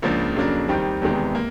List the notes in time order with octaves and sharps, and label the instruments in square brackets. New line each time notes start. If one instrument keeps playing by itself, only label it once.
[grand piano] C#2 C#3 F3 A#3 D4
F2 C#3 F#3 A#3 D4
D#2 D#3 G3 C4
E2 C3 D#3 G#3 B3
A#3